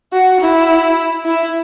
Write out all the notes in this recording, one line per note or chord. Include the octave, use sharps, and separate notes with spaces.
F#4
E4
E4